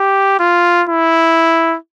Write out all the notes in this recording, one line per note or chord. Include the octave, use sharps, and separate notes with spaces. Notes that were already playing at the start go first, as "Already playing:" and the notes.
Already playing: G4
F4
E4